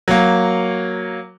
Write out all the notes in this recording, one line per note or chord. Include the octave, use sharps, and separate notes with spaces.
F#3 A#3